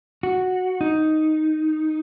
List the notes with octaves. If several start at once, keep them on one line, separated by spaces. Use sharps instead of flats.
F#4
D#4